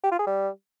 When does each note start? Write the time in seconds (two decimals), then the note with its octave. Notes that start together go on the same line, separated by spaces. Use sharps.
0.04 G4
0.12 F4
0.19 G#4
0.27 G3